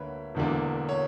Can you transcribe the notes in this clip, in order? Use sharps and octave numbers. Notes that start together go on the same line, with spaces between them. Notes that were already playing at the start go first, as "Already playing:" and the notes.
Already playing: D2 D3 A#3 B4 C#5 E5
E1 E2 D3 A#3 D4
C#5